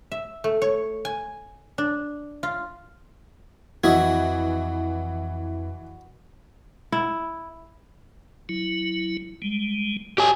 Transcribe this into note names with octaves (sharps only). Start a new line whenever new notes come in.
E5
A3
C#5
G#5
D4
F4
F2 E3 F#4 D#5 E5 G#6
E4
F#3 E4
G3 G#3
F#4 G4 C#5 D#5 G#5